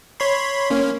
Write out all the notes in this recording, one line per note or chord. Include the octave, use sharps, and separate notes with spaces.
C#5 B5 C6
A#3 C#4